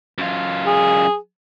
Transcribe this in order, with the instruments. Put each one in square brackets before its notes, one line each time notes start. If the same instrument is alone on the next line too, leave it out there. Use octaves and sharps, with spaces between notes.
[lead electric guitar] F#2 F4
[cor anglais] G#4